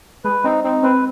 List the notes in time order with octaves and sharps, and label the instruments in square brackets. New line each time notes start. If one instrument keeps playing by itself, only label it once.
[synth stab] G#3 [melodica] B4
[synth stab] C4 [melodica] D#4
[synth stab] C4 [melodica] D#4
[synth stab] C4 [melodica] B4